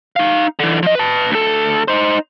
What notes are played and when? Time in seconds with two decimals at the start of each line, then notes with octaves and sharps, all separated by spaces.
0.16 D#4 F5
0.59 D3 E3
0.83 F3 D#5
0.95 B4 A5
1.31 D2 A4
1.88 D#4 C5